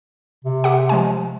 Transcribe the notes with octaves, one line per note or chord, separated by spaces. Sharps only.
C3
G4 F#5
F3 G#3 G#5